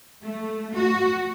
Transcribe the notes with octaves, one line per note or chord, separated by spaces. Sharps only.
A3
F#4